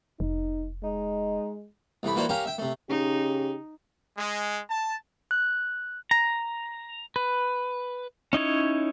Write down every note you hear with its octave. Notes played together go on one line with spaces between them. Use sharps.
F1 D#4
G#3 D#4
C2 E3 A3 B5
E3 A#3 E4 F#4 C5 D5
C#4 G4 A#4 F5 A#5
E5 G5
C3 A3
C#3 D#4 G4
G#3
A5
F#6
A#5
B4
C#4 D#4 E4 C#5